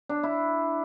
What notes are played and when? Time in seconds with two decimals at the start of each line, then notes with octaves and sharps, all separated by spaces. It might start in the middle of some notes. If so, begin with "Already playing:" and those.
0.09 D4
0.23 E4